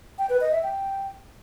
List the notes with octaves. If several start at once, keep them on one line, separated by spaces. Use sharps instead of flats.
G5
B4
D#5
E5
G5